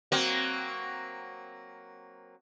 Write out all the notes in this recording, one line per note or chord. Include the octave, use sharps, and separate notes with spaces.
F#3 A#3 C4